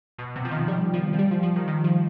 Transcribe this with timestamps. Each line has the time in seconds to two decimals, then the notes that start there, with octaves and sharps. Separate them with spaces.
0.18 B2
0.36 C3
0.45 F3
0.51 D#3
0.68 G3
0.94 F3
1.13 F3
1.19 G3
1.31 F3
1.43 F3
1.56 D#3
1.68 D#3
1.84 F3